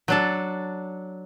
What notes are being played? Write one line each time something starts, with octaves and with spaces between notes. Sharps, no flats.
F#3 D4 A4